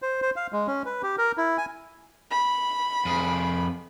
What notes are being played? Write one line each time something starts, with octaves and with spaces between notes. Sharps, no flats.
C5
C5
F5
G#3
C#4
B4
G4
A#4
E4
G#5
B5
F2 G#4